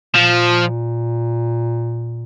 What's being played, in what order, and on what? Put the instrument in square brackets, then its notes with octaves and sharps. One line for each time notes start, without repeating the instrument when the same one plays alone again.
[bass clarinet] A#2 [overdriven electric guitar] F3